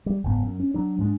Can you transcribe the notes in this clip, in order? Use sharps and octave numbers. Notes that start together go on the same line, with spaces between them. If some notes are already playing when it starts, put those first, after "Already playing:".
G3
F#1 G#2 B3
F#2
C#4
F#3 D4
G#2 G#3 D4